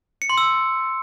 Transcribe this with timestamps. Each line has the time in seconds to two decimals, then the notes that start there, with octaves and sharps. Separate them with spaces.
0.22 C#7
0.30 C6
0.38 E6